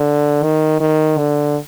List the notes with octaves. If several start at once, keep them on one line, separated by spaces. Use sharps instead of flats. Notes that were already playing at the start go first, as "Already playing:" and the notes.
Already playing: D3
D#3
D#3
D3